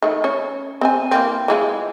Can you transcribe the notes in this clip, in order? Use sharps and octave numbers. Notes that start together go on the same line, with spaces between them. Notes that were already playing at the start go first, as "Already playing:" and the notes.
D#3 A3
C#4 C#5
C4 C5 G#5
E3 A#3 C4
E3 G#3 F4